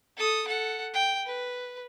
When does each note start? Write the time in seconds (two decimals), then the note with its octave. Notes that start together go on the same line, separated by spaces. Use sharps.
0.17 A4 D#6
0.46 A4 F#5
0.94 G5
1.26 B4